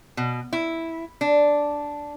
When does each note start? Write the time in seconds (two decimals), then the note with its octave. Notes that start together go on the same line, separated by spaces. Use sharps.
0.17 B2
0.53 E4
1.21 D4